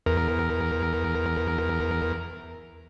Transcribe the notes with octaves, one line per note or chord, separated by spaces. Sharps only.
E2 A#4